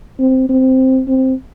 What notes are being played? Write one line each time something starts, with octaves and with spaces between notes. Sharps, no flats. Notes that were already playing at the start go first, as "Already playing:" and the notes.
C4
C4
C4